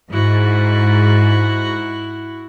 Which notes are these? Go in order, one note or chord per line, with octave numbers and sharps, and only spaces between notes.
G#2 E4 F#4